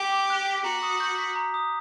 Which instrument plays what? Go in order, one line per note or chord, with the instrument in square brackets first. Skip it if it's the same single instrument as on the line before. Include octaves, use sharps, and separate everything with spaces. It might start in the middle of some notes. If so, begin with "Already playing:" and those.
Already playing: [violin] G4
[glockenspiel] D6
F#6
B6
[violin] F#4 [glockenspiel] A#5
[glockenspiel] D#6
G6
B6
A#5
D#6